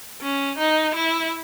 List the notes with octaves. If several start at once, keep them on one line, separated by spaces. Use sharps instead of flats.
C#4
D#4
E4